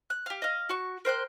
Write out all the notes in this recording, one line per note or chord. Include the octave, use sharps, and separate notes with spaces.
F#6
G4 F5
D#5 F5
F#4 C#6
A#4 C5 G5 F#6